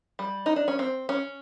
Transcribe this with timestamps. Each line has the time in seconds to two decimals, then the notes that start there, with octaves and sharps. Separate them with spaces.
0.19 G3
0.46 D#4
0.56 D4
0.68 C#4
0.79 C4
1.09 C#4